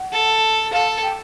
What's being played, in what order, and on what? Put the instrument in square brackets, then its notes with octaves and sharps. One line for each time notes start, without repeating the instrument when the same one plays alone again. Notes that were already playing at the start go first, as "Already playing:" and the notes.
Already playing: [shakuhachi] F#5
[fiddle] A4
[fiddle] A4 [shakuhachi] F5
[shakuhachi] G5